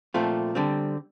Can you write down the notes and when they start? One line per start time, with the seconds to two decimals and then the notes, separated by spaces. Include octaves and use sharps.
0.14 A#2 F3 A3 C4 F4
0.55 D3 G3 C4